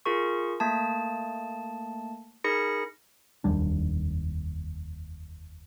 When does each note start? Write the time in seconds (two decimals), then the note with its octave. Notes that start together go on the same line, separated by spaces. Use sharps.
0.06 F4 G#4 A#4 C#6
0.60 A3 A#3 A5
2.44 D#4 G#4 A#4 B5 A#6 C#7
3.44 F1 D#2 G3 D4